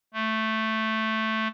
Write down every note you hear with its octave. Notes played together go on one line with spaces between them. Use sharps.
A3